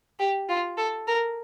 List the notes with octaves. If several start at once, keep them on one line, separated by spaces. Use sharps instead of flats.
G4
F4
A4
A#4